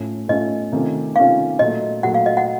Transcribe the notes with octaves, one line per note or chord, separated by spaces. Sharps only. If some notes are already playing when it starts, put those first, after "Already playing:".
Already playing: A2 A3 C#4 F4
A2 A3 C#4 F4 D#5
C3 D#3 A3 C#4 F4
C3 D#3 A3 C#4 F4 F5
A#2 F#3 A3 D#5
A#2 F#3 A3 F#5
F5
D#5
F#5